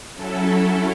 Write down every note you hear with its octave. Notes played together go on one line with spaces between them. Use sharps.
F#3 C#4 E4 A4